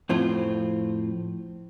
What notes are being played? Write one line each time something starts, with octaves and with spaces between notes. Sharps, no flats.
F2 A2 C4 F4